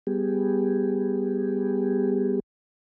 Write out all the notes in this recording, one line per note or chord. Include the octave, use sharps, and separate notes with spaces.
G3 B3 G4 G#4